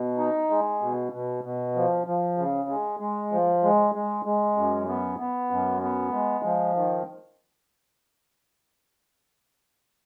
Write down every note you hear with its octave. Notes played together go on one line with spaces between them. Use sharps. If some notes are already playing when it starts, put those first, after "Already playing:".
Already playing: B2
D#4
G#3
B2
B2
B2
F3
F3
C#3
G#3
G#3
F3
G#3
G#3
G#3
F#2
B3
B3
F#2
B3
G#3
F3
D#3